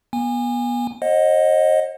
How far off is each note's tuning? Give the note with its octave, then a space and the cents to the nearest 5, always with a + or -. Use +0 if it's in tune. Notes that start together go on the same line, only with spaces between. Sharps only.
B3 -30 G#5 -25
C5 +45 D#5 +0 F#5 -15